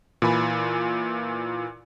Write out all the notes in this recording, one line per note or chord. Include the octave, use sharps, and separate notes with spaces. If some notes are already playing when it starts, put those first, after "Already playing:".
A#2 E3 G#5 B5